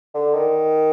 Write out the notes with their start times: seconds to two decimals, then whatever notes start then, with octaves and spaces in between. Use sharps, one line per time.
0.14 D3
0.34 D#3